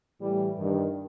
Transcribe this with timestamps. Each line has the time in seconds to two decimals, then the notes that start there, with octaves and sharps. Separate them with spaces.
0.21 A2 E3 G3
0.56 G2 D#3